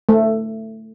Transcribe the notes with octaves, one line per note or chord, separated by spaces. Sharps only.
A3